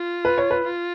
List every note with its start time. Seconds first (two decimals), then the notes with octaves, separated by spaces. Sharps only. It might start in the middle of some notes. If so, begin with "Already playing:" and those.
Already playing: F4
0.25 B4
0.38 C#5
0.51 B4
0.64 F4